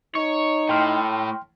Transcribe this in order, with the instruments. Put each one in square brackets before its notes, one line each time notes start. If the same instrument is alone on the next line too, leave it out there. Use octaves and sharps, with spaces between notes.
[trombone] D#4 [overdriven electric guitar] C#5
[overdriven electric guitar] A2 [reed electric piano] G5 C6 F6